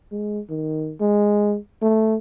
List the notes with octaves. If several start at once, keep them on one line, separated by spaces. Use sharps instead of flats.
G#3
D#3
G#3
A3